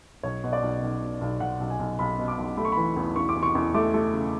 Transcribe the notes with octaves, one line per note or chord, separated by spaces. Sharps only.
B1 C#5
B2
D5
B1
B1
B2
B1
B1 F#5
B1
G#5
B1
B1 B5
B2
D6
B1
A3 B5
C#6
E3 B5
E2
E2 C#6
D6
E2
C#6
E2
A3 D6
A3
C#3